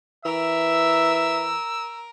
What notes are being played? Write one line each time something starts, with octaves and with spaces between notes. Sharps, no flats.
E3 A#4 E5 E6